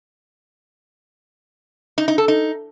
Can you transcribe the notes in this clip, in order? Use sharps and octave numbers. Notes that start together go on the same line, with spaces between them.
D#4
D#4
A4
D#4